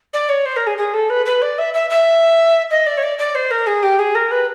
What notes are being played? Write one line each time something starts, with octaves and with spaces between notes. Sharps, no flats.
D5
C#5
C5
A#4
G#4
G#4
A4
B4
B4
D5
E5
E5
E5
D#5
D5
C#5
D5
D5
C5
A#4
G#4
G4
G#4
A#4
B4